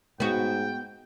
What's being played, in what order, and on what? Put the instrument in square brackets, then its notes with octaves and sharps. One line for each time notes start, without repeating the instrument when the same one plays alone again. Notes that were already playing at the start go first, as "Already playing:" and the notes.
[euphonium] G#2 [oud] B3 F#4 [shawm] G5